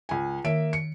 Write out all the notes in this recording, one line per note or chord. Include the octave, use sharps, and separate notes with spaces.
C#2 G#5
D#3 A#3 E5 D7
C#7